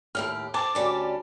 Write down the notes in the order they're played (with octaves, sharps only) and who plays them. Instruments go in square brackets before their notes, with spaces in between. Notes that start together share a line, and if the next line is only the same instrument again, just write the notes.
[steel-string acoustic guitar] D#2 A2 G4 [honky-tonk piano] F6
[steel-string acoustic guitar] C4 [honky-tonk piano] A5 [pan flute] D6
[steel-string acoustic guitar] D2 G3 C#4